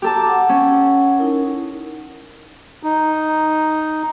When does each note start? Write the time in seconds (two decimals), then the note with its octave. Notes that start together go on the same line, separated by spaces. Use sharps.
0.02 G4 A4 G5 A5 A#5 D6
0.28 F#5
0.49 C#4
1.18 D#4 E4 A#4
2.83 D#4